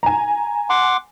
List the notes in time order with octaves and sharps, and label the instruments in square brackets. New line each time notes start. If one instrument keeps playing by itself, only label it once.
[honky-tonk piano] G#5 A#5
[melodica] F#5 C6 D6